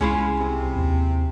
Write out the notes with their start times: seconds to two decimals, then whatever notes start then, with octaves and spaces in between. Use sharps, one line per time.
0.01 C2 G#3 C#4 E4 F4
0.39 C3
0.75 D#2